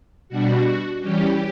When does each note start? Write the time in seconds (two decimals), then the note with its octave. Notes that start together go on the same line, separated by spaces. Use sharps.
0.29 B2 G3 D4 F#4
1.00 E3 G3 C#4 G4